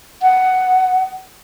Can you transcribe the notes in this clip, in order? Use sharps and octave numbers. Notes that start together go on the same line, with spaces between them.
F#5